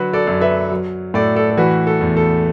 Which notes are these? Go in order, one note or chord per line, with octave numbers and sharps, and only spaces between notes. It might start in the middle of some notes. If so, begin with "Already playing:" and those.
Already playing: D3 F#3 F#4 B4
A4 D5
F#2
B4 E5
F#3
A2 A4 D5
A4 D5
A4
E3 F#4 B4
A4
E2
A4